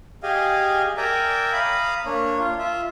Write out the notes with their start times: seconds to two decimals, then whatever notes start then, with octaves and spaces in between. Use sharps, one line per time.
0.23 G4 G#4 D#5 F5 G#5
0.97 A#4 D5 E5 G5 G#5 A#5
1.52 F5 A#5 B5 D#6
2.05 A#3 D4 C#5
2.39 F4
2.58 F4 E5